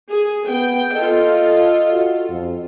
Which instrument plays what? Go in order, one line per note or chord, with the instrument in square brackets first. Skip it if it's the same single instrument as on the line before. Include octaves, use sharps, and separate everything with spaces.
[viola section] G#4
[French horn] B3 [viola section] G5
[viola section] F4 A4 [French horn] D#5
[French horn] F#4
F2